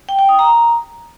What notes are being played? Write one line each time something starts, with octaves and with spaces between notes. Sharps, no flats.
G5
G5
D#6
A#5